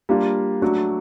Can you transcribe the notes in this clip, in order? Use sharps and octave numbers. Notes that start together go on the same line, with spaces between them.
G3 A#3 D4 F4
F#3 A3 D4 F#4